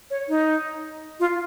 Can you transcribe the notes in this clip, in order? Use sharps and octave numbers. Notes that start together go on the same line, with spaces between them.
C#5
D#4
F4